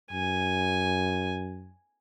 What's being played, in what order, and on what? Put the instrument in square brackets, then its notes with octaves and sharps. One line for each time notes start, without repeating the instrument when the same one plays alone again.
[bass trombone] F#2 [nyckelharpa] G#5